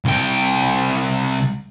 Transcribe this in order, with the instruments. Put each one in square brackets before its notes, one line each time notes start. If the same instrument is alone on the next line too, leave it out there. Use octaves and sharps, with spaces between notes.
[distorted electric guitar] C2 G5